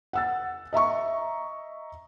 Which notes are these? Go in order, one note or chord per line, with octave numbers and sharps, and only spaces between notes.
F#5 E6 A6
D#5 E5 A#5 C#6